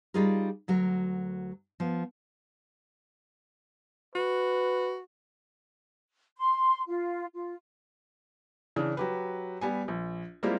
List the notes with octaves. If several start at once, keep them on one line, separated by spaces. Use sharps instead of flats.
G3 D#4 F4 G#4 A#4
D2 F#3 A#4
F3 B3
F#4 B4
C6
F4
F4
C#3 E3 D4
F#3 G4 B4
G3 B3 G#5
A#1
G3 G#3 A#3 C4 E4 F4